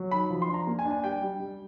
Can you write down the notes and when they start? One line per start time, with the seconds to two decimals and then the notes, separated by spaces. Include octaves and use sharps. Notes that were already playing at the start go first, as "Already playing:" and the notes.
Already playing: F#3
0.11 D#3 B5
0.30 F3
0.42 C6
0.48 D4
0.54 A#5
0.67 A#3
0.79 G#5
0.85 D4
0.91 G#5
1.04 G3 G5
1.22 G3
1.40 G3